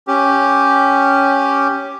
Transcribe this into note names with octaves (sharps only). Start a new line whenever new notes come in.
C#4 G4